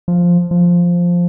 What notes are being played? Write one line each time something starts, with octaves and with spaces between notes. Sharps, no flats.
F3
F3